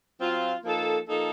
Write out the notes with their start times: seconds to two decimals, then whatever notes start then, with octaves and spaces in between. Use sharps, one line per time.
0.19 F#3 C4 F4
0.64 F3 A#3 D#4 A4
1.07 F3 A#3 D#4 A4